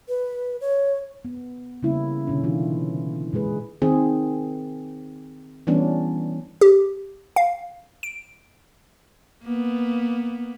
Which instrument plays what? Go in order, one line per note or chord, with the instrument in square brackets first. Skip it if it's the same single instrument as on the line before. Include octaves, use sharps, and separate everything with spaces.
[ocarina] B4
C#5
[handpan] B3
C#3 G3 A#3 C#4 E4
B2 D3 C#4
E3 D4 D#4 F4
A#2 G#3 G#4 B4
D#3 C4 G#4
E3 G3 B3 C#4 D4
[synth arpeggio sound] G4
F5
D7
[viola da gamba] A#3 B3